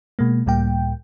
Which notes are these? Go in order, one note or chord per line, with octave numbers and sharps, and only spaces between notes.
B2 G#3 A#3
C#2 A2 G3 A#3 G5